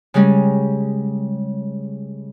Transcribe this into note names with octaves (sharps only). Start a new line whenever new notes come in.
C#3 G3 G#3 C#4